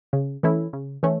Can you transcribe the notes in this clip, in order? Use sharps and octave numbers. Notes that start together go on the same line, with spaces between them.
C#3
E3 A3 C#4 E4
C#3
E3 A3 C#4